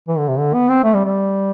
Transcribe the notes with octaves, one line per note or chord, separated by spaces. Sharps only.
E3
D3
C3
D3
B3
C4
A3
G3
G3